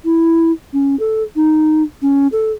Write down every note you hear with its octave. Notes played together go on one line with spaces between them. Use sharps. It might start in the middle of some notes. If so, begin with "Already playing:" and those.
E4
C#4
A4
D#4
C#4
A4